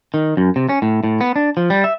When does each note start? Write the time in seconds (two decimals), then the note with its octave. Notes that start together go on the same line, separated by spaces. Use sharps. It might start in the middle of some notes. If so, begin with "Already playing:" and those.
0.14 D#3
0.37 F#2
0.56 C3
0.69 C#4
0.82 A2
1.04 A2
1.21 B3
1.36 D4
1.57 F3
1.70 G3
1.84 E5